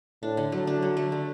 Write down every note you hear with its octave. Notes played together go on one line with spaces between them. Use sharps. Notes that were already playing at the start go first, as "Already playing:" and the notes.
A2 D4
D3
F#3 A3
D4
D3 F#3
A3
D3